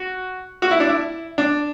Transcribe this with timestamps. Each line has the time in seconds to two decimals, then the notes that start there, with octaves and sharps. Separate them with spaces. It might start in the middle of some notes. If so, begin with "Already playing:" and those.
Already playing: F#4
0.62 F#4
0.71 E4
0.80 D4
0.89 E4
1.38 D4